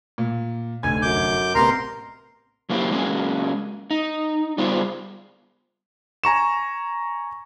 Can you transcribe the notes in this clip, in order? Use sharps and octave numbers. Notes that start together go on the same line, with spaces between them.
A#2
F1 D2 G#5 G#6
F#2 D6 G6
A1 C3 B3 A#4 A#5 C6
F#3 A#3 C4 E4 G4
F#3 G#3 A#3 C#4 G#4
D#4
G3 B3 F4 G#4 C5
G#5 A#5 C#6 E7